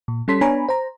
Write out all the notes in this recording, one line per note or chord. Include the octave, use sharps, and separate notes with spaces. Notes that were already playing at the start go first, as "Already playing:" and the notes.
A#2
G3 C#4 A4 C6 B6
B3 D4 C#5 G#5 A#5 B5
C5 A#5